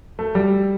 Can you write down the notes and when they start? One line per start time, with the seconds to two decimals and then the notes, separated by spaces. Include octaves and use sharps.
0.19 A3
0.35 G3